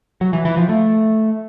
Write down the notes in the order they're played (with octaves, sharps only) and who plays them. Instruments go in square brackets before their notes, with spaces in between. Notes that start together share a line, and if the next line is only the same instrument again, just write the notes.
[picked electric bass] F#3
E3
E3
F3
A3